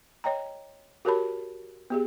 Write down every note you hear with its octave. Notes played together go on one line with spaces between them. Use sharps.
C#5 D#5 G5 A#5
F#4 G4 A#4 C#5 A5 B5
B3 G4 G#4